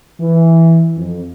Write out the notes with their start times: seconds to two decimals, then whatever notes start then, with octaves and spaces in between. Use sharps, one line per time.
0.20 E3
0.97 F2